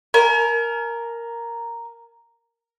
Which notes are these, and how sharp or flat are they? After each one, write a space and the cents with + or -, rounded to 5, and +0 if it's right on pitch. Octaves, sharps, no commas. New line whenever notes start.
A#4 +0 G#5 +45